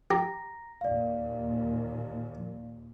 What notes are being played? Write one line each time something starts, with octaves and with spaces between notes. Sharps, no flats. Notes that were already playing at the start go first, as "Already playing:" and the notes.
G4 A#5 A#6
D#2 A#2 D5 F5